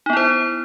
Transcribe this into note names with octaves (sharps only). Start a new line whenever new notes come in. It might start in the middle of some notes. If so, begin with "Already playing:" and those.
B3 D#4 E4 C5